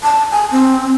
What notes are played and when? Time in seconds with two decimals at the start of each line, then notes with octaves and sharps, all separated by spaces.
0.04 A5
0.32 G#5
0.52 C4